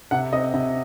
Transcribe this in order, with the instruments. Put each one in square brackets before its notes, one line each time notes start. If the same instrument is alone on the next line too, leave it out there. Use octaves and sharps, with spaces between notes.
[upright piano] C3 F#5
C4 D#5
C3